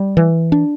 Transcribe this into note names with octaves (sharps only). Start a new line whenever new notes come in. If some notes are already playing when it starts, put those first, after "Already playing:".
Already playing: G3
E3
D4